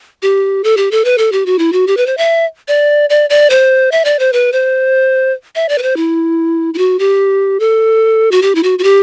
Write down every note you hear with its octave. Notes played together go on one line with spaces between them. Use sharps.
G4
A4
G4
A4
B4
A4
G4
F#4
E4
F#4
G4
B4
C5
E5
D5
D5
D5
C5
E5
D5
C5
B4
C5
E5
D5
B4
C5
E4
E4
F#4
G4
A4
F#4
G4
E4
F#4
F#4
G4